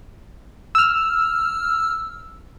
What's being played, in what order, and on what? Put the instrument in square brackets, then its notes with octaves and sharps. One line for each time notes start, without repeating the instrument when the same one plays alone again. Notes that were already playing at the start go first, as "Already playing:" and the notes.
[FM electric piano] E6 F6